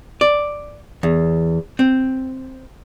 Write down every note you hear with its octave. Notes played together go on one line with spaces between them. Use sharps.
D5
E2
C4